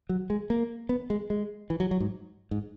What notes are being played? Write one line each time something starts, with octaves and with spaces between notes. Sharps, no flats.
F#3
G#3
A#3
B3
G#3
G#3
E3
F#3
F#3
G#2
G#2